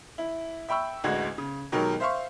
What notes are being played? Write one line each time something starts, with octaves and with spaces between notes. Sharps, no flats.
E4
E5 G5 B5 C#6 E6
A1 D2 G#3 F#4 G#6
C#3
B2 D#3 F#3 G#3 G4 A#4
C5 E5 F5 C6 C#6